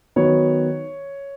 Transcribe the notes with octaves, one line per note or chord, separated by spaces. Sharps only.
D#3 F#3 B3 C#5